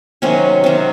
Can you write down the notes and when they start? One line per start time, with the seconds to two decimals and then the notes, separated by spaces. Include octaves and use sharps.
0.22 C3 D#3 F#3 C#4
0.64 C3 D#3 F#3